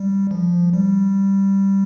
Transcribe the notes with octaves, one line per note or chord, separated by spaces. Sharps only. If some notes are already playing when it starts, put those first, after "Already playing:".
Already playing: G3
F3
G3